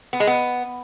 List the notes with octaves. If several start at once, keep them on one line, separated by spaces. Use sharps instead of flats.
B3
G#3
B3